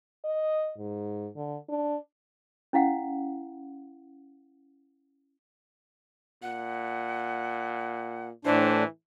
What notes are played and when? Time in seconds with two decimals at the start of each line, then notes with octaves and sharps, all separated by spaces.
0.25 D#5
0.78 G#2
1.36 D3
1.69 D4
2.73 C#4 E4 F5 F#5
6.43 A#2 F#5
8.45 A2 E3 D4 C5